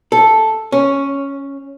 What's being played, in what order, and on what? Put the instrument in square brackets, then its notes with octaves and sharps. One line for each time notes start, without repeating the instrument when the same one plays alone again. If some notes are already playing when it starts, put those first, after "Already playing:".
[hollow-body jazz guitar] A4
C#4